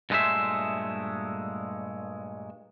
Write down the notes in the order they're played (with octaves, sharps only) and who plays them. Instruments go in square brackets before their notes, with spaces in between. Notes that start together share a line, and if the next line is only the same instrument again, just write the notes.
[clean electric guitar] G2 A#2 G#3 A3 C5 E5